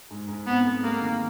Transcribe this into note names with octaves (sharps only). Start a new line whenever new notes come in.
G#2
G#2
B3 C4
A3
G#3 A#3
D#3